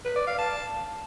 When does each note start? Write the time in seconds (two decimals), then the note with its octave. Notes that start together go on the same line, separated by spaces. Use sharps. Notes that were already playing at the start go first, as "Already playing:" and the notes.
0.05 B4
0.16 D5
0.27 F5
0.38 A5